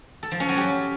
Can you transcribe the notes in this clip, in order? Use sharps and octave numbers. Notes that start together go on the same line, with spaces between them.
A4
F3
C#4
F#3
G4